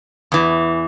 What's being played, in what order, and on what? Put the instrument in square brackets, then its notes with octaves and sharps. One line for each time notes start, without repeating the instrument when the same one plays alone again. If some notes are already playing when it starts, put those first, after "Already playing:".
[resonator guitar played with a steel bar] E2 E3